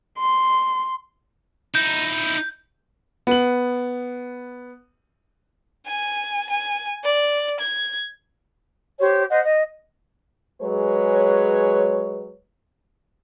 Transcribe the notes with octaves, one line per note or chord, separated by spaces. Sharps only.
C6
D#4 E4 G6
B3 F#7
G#5
G#5
D5
G#6
G4 C5 C#5
C5 D#5 F#5
D#5
F#3 G#3 G#4 B4 C#5